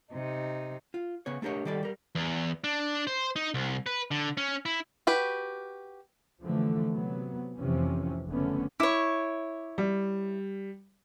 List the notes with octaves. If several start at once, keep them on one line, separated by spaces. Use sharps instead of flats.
C3 D#4
F4
C#3 B3 C#5
A3 D4 G4 A#4 C#5
D#3 G3 G4 A4 D5
G3 A#4
E2
D4
C5
D#4
C2
B4
D3
C#4
E4
F#4 G4 B4
D3 E3 F3 A3
C3 F#3 B3
F1 C3 E3 F3 C#4
F#1 F2 D3 A3 B3 C#4
E4 C#5 D6
G3